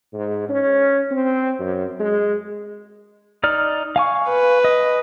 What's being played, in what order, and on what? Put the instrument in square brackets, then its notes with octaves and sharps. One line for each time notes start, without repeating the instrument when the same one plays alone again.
[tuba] G#2
C#4
C4
F#2
G#3
[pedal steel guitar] D#4 D5 F6
F5 G#5 C#6
[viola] B4
[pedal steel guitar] D#5